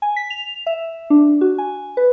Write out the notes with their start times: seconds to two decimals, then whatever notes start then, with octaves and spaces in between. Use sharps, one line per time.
0.02 G#5
0.16 B6
0.30 F7
0.67 E5
1.10 D4
1.41 F#4
1.58 G#5
1.97 B4